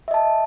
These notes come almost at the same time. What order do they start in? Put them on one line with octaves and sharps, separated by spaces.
E5 D#5 A5